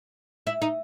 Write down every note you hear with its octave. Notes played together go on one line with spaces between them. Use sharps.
E4
D#4